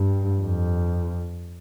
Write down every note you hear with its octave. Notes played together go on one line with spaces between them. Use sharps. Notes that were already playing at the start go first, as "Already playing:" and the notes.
Already playing: G2
F2